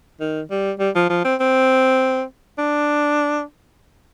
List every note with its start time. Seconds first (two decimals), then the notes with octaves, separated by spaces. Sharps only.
0.20 D#3
0.50 G3
0.79 G3
0.96 F3
1.10 F3
1.25 C4
1.40 C4
2.58 D4